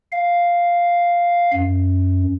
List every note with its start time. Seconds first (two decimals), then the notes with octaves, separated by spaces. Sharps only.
0.12 F5
1.54 F#2